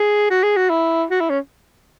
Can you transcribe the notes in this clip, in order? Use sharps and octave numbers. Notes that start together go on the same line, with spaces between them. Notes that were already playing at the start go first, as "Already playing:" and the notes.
Already playing: G#4
F#4
G#4
F#4
E4
F#4
E4
C#4